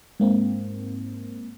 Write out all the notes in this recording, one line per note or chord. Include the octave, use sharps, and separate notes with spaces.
G#2 A#3 C4